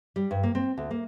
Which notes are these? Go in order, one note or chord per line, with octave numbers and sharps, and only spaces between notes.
G3
G2
A#3
C4
D2
A#3